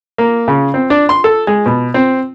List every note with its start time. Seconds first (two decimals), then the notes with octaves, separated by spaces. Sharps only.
0.18 A#3
0.48 C#3
0.74 C4
0.90 D4
1.09 C6
1.24 A4
1.47 G#3
1.66 B2
1.94 C4